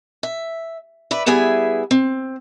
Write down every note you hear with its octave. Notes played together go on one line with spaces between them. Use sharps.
E5
B4 D5 E5
G3 B3 E4 G#4 E5 G#5
C4